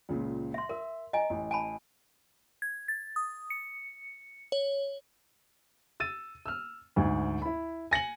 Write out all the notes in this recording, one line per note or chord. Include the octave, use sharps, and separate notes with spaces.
C#2 A#2 C#3
E5 C6
A#4 E5
D#5 G#5 A#5
A1
G#5 A5 B5
G#6
A6
D#6
C#7
C#5
E6 A6 D#7
E6 F6
D2 G#2
E4 B5
G#5 A#6 C#7 F#7